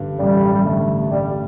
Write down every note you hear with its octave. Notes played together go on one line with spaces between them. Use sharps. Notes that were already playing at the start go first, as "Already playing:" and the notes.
Already playing: A1 G2 D3
A1 G3
G3
G2 D3 A3
A1 G3